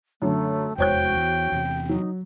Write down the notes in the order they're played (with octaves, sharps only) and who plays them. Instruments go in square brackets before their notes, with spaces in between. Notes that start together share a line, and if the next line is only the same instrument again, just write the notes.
[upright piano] F#2 D3 [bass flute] A3
[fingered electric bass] F1 E2 G#3 [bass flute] F#4 [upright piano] C5 C#5 G6 [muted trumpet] G5
[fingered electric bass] E2
E2 C3
[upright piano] F#3 [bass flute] D#4